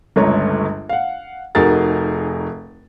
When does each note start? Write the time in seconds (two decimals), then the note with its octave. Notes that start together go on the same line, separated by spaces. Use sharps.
0.16 G1 C#2 A3 C#5 A#5
0.89 F5 F#5
1.55 F1 D#4 F#4 G#4 A#4 A6